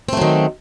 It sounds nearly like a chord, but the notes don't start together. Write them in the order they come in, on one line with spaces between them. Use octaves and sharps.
C4 A3 F#3 D#3